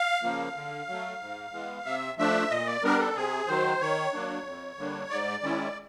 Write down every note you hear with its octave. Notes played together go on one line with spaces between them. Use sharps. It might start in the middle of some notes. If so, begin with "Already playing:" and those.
Already playing: F5
C#3 F3 A#3
D3
F#3 A3
G#2
E3 G#3 B3
C3 E5
F3 A3 D4 E5
A#2 D#5
D5
G3 B3 D4 A#4
A4
C3 G#4
D#3 F#3 C5
D#3 C#5
F#3 A#3 D4
F2
D3 G3 A#3 D4
G#2 D5
D#3 G#3 C#4 E4